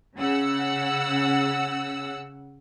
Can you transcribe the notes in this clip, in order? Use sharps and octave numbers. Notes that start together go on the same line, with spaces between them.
C#3 F#5 E6